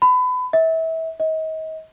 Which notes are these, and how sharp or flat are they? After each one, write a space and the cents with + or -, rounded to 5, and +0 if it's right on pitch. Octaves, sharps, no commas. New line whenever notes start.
B5 +30
E5 -30
D#5 +35